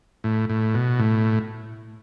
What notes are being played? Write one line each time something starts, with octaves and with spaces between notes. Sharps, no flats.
A2
A2
B2
A2